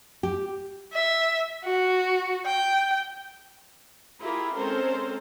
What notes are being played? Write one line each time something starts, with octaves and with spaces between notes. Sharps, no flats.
G4
E5
F#4
G5
E4 F4 G4 G#4 A#4
G#3 C4 C#4 A4 A#4 C5